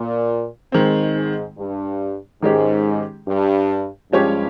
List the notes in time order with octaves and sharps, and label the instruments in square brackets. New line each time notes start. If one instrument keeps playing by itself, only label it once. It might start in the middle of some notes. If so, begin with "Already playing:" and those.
Already playing: [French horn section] A#2
[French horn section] G#2 [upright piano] D#3 G#3 C4
[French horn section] G#2
G2
[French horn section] G#2 [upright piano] D#3 G#3 C#4 G4
[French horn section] G2
[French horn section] G2 [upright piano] F3 G#3 C#4 G4 C#5